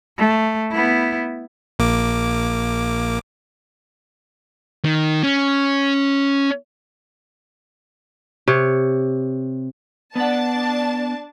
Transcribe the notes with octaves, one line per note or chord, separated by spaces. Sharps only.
A3
B3 E4
A#1 A#3 D6
D#3
C#4
C3 C#5
B3 D4 F#5 A5